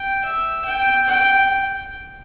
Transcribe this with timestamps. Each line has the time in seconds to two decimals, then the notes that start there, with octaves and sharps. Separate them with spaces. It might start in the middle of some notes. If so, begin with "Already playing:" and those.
Already playing: G5
0.24 E5
0.65 G5
1.07 G5